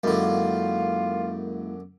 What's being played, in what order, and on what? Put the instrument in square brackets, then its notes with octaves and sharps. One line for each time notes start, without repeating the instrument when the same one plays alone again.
[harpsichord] F#2 D3 [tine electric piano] G#3 A#3 E4 [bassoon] F4